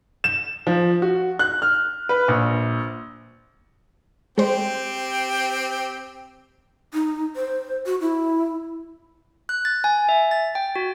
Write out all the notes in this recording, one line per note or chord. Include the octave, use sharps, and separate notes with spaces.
E7
F3
F#4
F#6
F6
B4
A#1
G#3 C4 G4 C5
D#4
C5
F#4
E4
F#6
A6
G#5
E5
A6
G5
F#4